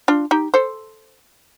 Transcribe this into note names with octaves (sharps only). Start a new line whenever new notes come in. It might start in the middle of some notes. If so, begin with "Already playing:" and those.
D4 F4
D#4 G4
A4 C5